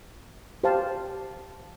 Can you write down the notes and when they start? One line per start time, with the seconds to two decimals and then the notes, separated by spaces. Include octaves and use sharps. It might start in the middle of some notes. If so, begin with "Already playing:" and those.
0.64 G4 C5 F5 A5